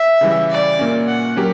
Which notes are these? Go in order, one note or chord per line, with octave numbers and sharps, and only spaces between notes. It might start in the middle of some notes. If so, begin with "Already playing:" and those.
Already playing: E5
C#3 E3 G3
D5
A#2 A#3 C#4
F#5
F#3 C#4 G4 A#4